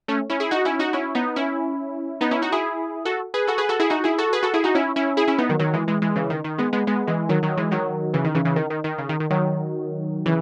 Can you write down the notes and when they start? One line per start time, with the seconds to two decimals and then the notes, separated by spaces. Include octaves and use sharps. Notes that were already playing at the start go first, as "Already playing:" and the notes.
0.08 A3 C#4
0.30 C#4 E4
0.40 E4 G#4
0.51 D#4 F#4
0.65 C#4 E4
0.79 D#4 F#4
0.93 C#4 E4
1.15 B3 D#4
1.36 C#4 E4
2.21 B3 D#4
2.31 C#4 E4
2.42 D#4 F#4
2.52 E4 G#4
3.05 F#4 A4
3.34 G#4 B4
3.47 F#4 A4
3.58 G#4 B4
3.69 F#4 A4
3.80 E4 G#4
3.90 D#4 F#4
4.04 E4 G#4
4.18 F#4 A4
4.33 G#4 B4
4.43 F#4 A4
4.54 E4 G#4
4.64 D#4 F#4
4.75 C#4 E4
4.96 C#4 E4
5.17 E4 G#4
5.28 C#4 E4
5.38 B3 D#4
5.49 D#3 F#3
5.59 D#3 F#3
5.73 E3 G#3
5.88 E3 G#3
6.02 E3 G#3
6.16 C#3 E3
6.30 D#3
6.44 D#3
6.58 G#3 B3
6.73 G#3 B3
6.87 G#3 B3
7.07 E3 G#3
7.29 D#3 F#3
7.43 D#3 F#3
7.57 E3 G#3
7.71 D#3 F#3
8.14 C#3 E3
8.24 D#3
8.35 C#3 E3
8.45 C#3 E3
8.56 D#3
8.70 D#3
8.84 D#3
8.98 C#3
9.09 D#3
9.20 D#3
9.30 D#3 F#3
10.26 C#3 E3